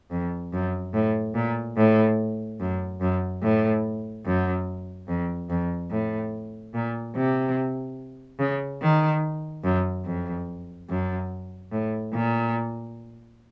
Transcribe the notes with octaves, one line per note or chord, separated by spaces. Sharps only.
F2
F#2
A2
A#2
A2
F#2
F#2
A2
F#2
F2
F2
A2
A#2
C3
C#3
D#3
F#2
F2
F#2
A2
A#2